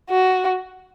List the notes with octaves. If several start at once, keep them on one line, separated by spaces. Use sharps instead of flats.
F#4